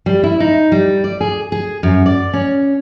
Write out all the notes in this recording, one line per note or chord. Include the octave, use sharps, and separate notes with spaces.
G3
E4
D#4
G3
D5
G#4
G#4
F#2
D5
C#4